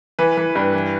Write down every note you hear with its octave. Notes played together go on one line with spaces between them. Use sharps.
E3 B4
E3
G2
E3